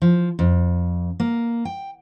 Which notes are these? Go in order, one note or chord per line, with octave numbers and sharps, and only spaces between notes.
F3
F2
A#3
G5